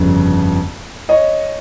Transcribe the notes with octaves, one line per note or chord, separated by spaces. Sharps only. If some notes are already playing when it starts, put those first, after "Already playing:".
Already playing: G1 F2 C#3
C#5 D#5